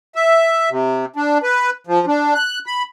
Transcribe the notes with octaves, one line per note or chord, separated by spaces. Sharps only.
E5
C3
D4
B4
F3
D4
F#6
B5